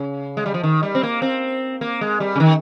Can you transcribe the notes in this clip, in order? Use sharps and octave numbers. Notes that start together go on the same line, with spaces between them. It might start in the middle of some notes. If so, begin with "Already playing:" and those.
Already playing: C#3
G#3
G3
F3
D#3
G3
C4
A#3
C4
A#3
G#3
G3
C#3
D#3